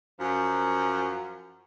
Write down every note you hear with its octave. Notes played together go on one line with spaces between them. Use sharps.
F#2 F3